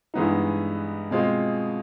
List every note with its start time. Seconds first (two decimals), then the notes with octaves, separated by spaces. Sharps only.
0.14 G2 E3 G#3 B3 D#4
1.11 B2 G#3 C4 F4